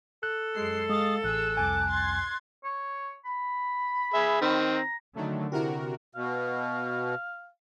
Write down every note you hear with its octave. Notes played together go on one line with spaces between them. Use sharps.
A4 F#6
F#2 G#3 C7
G#3 F5 D#6 A6
A1 G#4 E6 F#6
C2 F2 G#5 A5 D6
C6 G#6 A6
C#5
B5
G#4 E5
D#3 C4
A#5
D3 D#3 F#3 A3
C3 E4 F#4 G4 A#4
B2 F5